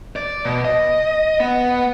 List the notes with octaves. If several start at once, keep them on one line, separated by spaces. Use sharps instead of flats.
D5
B2
D#5
B3